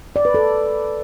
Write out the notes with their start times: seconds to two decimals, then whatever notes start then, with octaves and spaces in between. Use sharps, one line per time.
0.16 D5
0.25 B4
0.34 A4